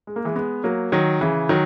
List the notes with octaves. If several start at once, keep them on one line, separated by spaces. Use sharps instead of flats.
G#3
A#3
E3 G#3
G#3 B3
F#3 A#3
D#3 F#3
C#3 E3
D#3 F#3